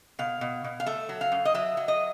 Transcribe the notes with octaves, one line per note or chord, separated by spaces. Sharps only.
B2 F5
B2
B2
F5
A3 E5
F#3
F5
F#2
D#5
F#3 E5
F#3
D#5